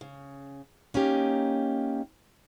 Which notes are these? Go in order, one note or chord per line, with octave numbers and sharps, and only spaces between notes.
C#3
A#3 C#4 D#4 G4